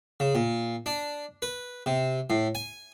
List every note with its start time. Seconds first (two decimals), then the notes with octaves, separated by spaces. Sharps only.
0.20 C#3
0.35 A#2
0.86 D4
1.42 B4
1.86 C3
2.30 A2
2.55 G#5